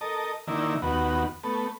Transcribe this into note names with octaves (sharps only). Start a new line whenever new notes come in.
A4 A#4 D#5
D3 D#3 A#3 E4
D#2 B3 F#4
A3 B3